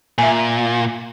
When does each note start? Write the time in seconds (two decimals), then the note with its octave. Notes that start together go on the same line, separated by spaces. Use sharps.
0.18 A#2 E5 G#5